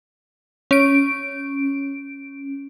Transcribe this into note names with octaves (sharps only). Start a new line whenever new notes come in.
C#4 D7